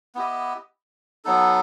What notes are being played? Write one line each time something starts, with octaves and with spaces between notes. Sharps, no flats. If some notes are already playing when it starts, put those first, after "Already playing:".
B3 E4 G4 D#5
F#3 B3 D#4 A4